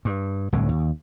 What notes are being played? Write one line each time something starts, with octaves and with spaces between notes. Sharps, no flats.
G2
D1 C2 A2 D3
D#2